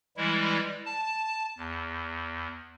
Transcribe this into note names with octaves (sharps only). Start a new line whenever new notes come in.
E3 G3 G#3 E4
A5
E2